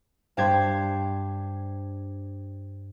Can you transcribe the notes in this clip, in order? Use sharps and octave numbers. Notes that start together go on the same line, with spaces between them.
G2 D4 G4 C5 G#6